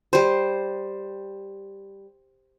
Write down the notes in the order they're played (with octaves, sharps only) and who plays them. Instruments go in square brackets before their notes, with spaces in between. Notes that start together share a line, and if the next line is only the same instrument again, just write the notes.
[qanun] G3 C5